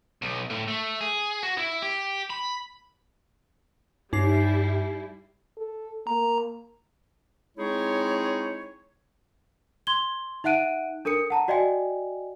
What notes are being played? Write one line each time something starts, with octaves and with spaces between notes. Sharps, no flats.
B1
A2
A3
G#4
F#4
E4
G4
B5
G2 G3 D#4 E4 C7
A4
A#3 A#5
G#3 C4 D#4 E4 G#4 C#5
C6 G#6 G7
D#4 E5 F#5 F#6 D7 D#7
D4 A4 A#4 D#6 C#7
F#5 A5 A#5
F#4 D5 D#5 F5 G5 G#5